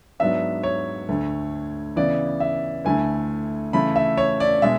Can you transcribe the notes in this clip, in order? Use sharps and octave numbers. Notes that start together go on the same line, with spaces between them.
G#2 F#3 B3 D4 E5
C#5
D2 D3 A3
C#3 E3 B3 E4 D5
E5
D2 D3 A3 E4 G#5
C#3 E3 A3 E4 B5
E5
C#5
D5
B2 G#3 D4 E5